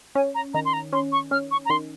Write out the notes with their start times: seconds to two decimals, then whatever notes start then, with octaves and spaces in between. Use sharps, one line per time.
0.15 C#4 G#5
0.35 A#5
0.54 D#3 A#5
0.65 C6
0.73 A#5
0.93 C#4 C6
1.12 C#6
1.31 C#4 F6
1.51 C#6
1.66 A#5
1.70 D#3 C6